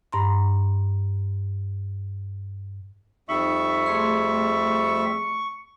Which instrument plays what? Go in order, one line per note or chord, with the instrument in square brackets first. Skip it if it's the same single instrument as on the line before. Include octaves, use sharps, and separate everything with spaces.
[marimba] G2 A#5 C6
[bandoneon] F2 G3 E5 [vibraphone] D#4 [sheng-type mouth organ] C#6
[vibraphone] A3 G#4 C6